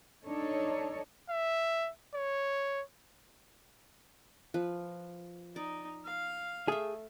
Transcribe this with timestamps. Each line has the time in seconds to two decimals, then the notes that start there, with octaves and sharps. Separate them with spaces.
0.24 D4 D#4 A4 C#5
1.30 E5
2.15 C#5
4.54 F3 B4
5.56 D#4 D5
6.05 F5
6.68 A3 G#4 E5